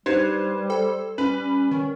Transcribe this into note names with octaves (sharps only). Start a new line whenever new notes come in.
G3 D4 D#4 G4 B4 C5 G#6
A4 G5
G3 C#4 B4 F#7
D#3 C#4